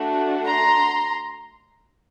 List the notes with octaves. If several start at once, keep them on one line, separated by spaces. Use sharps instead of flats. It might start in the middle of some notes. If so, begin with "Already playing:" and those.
Already playing: A3 D4 F#4
A#5 C6